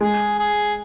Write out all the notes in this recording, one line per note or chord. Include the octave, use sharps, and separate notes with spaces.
G#3 G#4
G#4